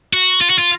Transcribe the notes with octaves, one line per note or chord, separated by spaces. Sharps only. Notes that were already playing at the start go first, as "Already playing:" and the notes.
F#4
F4
F#4
F4